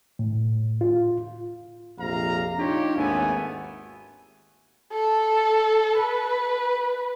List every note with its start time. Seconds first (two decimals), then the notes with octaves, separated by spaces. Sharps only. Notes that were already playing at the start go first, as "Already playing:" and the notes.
0.19 A2
0.81 F4
1.98 A#1 F2 C3 F5 A#5
2.58 D4 D#4 F4 G4 C#5
2.96 G#1 D#2 G#2 A3 B3 G#5
4.92 A4
5.98 B4